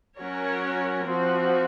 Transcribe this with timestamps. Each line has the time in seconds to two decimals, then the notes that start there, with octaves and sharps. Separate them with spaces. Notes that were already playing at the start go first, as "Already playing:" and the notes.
0.19 F#3 C#4 F#4 A#4 C#5
1.04 F3 C4 F#4